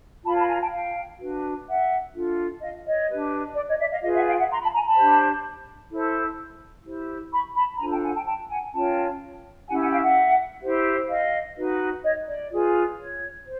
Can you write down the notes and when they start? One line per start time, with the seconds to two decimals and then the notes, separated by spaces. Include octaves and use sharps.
0.24 F4 A#4 C#5 A5 B5
0.36 A5 B5
0.48 G#5 A#5
0.61 G5 A5
0.71 F5 G5
1.20 D4 F#4 B4
1.66 E5 F#5
2.13 D4 F4 A4
2.60 D#5 F5
2.84 C#5 D#5
3.08 D4 G4 B4
3.55 D5
3.66 C#5 D#5
3.78 D5 E5
3.90 D#5 F5
4.02 F4 G#4 B4 D#5 F5
4.14 E5 F#5
4.25 F5 G5
4.37 E5 F#5
4.49 A#5 C6
4.61 A5 B5
4.72 G#5 A#5
4.84 A5 B5
4.96 D4 G4 C5
5.90 E4 A4 C5
6.84 E4 G4 C5
7.32 B5 C#6
7.55 A5 B5
7.79 D4 F4 A4 C5 G#5 A#5
7.91 G5 A5
8.03 F#5 G#5
8.14 G5 A5
8.26 G5 A5
8.49 F#5 G#5
8.73 C#4 F4 A#4 C#5 G5 A5
9.67 C#4 E4 G4 F#5 G#5
9.79 F#5 G#5
9.91 F5 G5
10.03 E5 F#5
10.62 E4 G4 C5
11.08 D#5 F5
11.56 D#4 F#4 B4
12.03 C#5 D#5
12.27 D5
12.50 F4 G#4 B4
12.97 C#5
13.44 C5